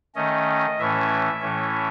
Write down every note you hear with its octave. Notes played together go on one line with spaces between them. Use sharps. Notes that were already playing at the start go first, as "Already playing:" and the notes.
D#3 A3 C#4 D#5
A2 E3 A3 C#4 E5
A2 E3 A3 C#4